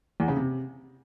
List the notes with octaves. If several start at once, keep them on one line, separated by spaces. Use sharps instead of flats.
E2
C#3
C3